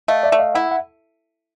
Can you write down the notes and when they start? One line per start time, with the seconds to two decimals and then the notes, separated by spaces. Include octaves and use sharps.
0.08 A3 D#5 F5
0.23 D5 E5
0.32 A3
0.39 D#5 F5
0.55 E4 E5 F#5
0.71 F#5